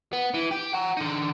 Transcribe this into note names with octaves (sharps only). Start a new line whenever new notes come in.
B3
E3
G4
F#5 A#5
D3 D#4